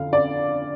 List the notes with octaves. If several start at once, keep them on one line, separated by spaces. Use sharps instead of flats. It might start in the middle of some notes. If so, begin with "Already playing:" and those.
Already playing: F2 D3 F5
D5